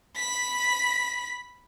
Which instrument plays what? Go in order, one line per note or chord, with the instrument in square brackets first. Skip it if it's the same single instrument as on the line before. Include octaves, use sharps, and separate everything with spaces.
[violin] B5 B6